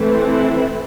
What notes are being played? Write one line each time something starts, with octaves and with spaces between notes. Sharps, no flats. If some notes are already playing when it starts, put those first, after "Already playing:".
Already playing: E3 A3 C4
E4